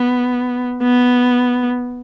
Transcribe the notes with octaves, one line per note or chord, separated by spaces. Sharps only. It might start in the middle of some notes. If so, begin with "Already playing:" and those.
Already playing: B3
B3